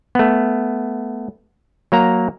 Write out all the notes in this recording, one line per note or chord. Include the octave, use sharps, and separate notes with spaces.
A3 B3
F#3 A#3 A#5